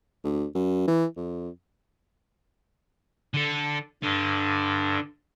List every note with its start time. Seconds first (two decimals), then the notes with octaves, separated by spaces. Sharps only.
0.24 D2
0.55 F#2
0.88 E3
1.17 F2
3.34 D3 A4
4.03 G2 D3